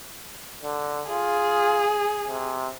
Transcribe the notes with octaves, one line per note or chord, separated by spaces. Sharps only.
D3
F4 G#4
C3